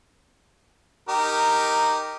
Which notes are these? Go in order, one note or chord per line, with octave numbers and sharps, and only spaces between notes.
D#4 G4 A#4